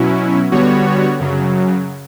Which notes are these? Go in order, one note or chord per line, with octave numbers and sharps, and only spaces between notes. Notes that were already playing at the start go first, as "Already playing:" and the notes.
Already playing: B2 F#3 C#4 E4
D3 G3 B3 F#4 C#5
F#2 C#3 F#3